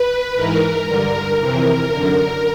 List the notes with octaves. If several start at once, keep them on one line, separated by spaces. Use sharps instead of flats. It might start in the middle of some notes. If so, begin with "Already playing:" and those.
Already playing: B4
G#2 E3 A#4
G2 D3 A#4
F2 C3 E3 A#4
F#2 D3